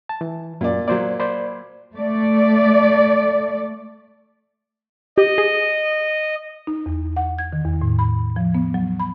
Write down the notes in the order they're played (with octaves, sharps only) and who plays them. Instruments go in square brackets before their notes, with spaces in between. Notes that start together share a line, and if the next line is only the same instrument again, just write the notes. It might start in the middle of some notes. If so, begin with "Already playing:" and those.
[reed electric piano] A5
E3
[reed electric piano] F#2 [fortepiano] A#2 D5
[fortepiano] A#2 F#3 [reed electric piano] C5 D5
[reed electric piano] C5 D5 B5
[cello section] A3 D5
[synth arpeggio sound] G4 [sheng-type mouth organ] D#5
[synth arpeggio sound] G#4
[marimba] D#4
E2
F#5
G#6
D#3
E2
A2
B5
F3
B3
F#3
B5